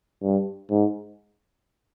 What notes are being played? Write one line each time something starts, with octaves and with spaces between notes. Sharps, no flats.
G2
G#2